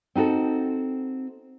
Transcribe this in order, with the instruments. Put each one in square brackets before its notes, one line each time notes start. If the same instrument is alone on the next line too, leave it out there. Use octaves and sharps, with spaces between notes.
[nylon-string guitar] C4 D#4 F#4 A4